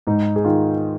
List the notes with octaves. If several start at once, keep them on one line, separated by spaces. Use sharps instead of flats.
G#2 D#4
G#4
D#3 F4